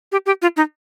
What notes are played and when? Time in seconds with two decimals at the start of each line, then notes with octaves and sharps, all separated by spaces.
0.12 G4
0.26 G4
0.42 F4
0.57 D#4